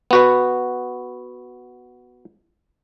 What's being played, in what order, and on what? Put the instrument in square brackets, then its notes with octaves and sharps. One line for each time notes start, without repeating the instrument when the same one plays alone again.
[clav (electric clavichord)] B3 F#4 B4